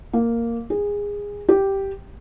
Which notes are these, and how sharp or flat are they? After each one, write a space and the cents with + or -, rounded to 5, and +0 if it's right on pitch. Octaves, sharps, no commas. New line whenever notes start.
A#3 -5
G#4 -20
G4 -5